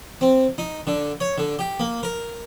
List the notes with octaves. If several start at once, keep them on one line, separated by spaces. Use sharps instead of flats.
C4
D#4
D3
C#5
D3
G4
A#3
A#4